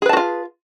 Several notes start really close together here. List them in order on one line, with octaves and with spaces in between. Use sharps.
G#4 B4 A5 F#4 F4